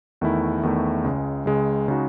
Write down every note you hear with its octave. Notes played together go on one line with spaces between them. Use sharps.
E2 D#3 A3 E4
E2 D#3 A3 E4
C#2 C#3 G#3
C#2 C#3 G#3
C#3 G#3 D#4 F#4